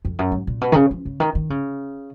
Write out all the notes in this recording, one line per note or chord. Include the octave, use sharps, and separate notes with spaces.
F2
F#2
G#2
A#2
B2
D#3
C#3
F3
C#3
D#3
D#3
C#3